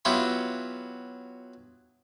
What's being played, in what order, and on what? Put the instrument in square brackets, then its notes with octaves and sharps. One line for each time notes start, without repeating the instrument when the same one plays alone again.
[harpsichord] F#3 B3 E4 F4 G4